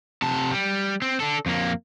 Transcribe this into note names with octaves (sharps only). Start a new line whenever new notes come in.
C3 A5
G3
C4
D4 A4
F2 A#3